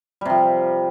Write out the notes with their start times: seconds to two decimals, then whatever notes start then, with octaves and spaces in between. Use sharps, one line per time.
0.21 G3
0.25 C3
0.30 F3